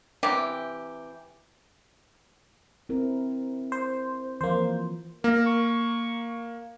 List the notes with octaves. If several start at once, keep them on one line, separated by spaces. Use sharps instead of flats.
C3 E3 G4
C4 E4 A#4
C5
E3 F3 A#3 C5
A#3 A#4
C#6